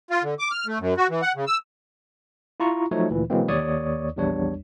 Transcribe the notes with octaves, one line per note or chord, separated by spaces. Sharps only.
F4
D3
D6
F6
A3
F#2
F#4
E3
F#5
C#3
E6
E4 F4 A#5 C#6
F3 F#3 A3 D#4 C#5
D2 A#2 E3
B2 E3 F#3 G#3 A#3 C4
D#2 C#5 D5 C#6 D#6
A#1 E2 G3 D4 C#5